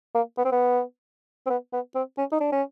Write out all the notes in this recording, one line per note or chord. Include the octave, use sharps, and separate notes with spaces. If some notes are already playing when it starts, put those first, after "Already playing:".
A#3
B3
C4
B3
C4
B3
B3
C4
C#4
D#4
D4
C#4